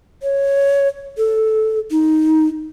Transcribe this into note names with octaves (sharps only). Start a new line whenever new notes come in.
C#5
A4
D#4